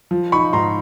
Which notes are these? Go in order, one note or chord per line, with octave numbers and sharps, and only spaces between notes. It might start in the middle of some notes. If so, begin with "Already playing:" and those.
F3
D#4 B5 C#6
G#2 A#5 C6